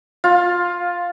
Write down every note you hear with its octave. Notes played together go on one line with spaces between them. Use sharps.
F4